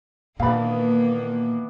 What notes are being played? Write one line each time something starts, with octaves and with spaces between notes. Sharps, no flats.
A#2 D#3 E3 A#3 B3 D4 F5 B5